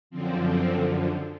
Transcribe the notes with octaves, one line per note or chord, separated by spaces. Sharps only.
F#2 D3 F3 C4
C4